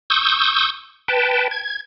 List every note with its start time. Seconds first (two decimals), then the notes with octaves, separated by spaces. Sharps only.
0.10 C#6 D#6 E6 G6
1.08 B4 G5 A5
1.51 G#6